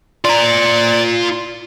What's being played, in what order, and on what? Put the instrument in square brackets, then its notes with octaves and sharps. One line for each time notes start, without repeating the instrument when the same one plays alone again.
[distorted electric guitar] F4 A#5 [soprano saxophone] D5